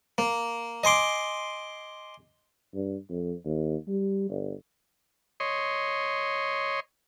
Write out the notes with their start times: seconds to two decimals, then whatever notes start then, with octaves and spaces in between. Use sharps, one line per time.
0.18 A#3
0.84 D#5 G#5 C6 D6
2.74 G2
3.10 F2
3.45 D#2
3.88 G3
4.29 G1
5.40 C#5 D#5 C6